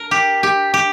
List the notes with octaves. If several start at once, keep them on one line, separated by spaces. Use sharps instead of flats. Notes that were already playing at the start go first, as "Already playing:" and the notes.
Already playing: A#4
G4
G4
G4